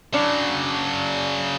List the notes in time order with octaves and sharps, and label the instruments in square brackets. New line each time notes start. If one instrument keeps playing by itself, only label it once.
[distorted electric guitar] C#3 F#3 [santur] D4